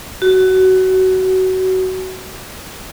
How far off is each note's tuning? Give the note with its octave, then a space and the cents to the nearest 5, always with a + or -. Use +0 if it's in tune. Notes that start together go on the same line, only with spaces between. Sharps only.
F#4 +20